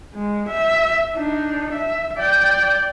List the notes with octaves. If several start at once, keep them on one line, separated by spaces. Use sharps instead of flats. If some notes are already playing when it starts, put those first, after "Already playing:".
G#3
E5
D4 D#4
E5
D5 G5